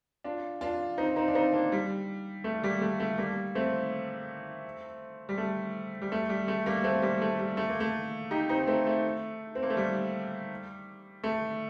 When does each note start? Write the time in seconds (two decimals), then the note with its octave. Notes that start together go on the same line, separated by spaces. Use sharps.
0.24 D4 F4
0.61 D4 F4
0.98 C4 D#4
1.16 C4 D#4
1.28 D4
1.35 C4 D#4
1.53 A#3 D4
1.72 G3
2.44 A3
2.64 G3 A#3
2.81 A3
3.00 A3
3.18 G3 A#3
3.55 A3 C4
5.29 G3
5.38 A3
6.02 G3
6.12 A3
6.29 G3
6.48 A3
6.66 G3 A#3
6.84 A3 C4
7.02 G3 A#3
7.22 A3
7.39 G3
7.57 A3
7.69 A#3
7.80 A3
8.31 D#4 G4
8.49 C4 D#4
8.67 A3 C4
8.87 A3
9.55 C4
9.63 A#3
9.70 A3
9.77 G3
11.24 A3